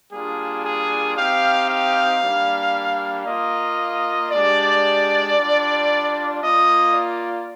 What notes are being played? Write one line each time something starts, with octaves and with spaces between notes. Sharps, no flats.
G3 A#3 D4 F4 G#4
G#4
C4 D#4 G4 F5
F5
G3 A#3 D4
A#3 F4 D#5
G#3 D4 G4 D5
G3 D4 F4
A#3 F4 D#5
D5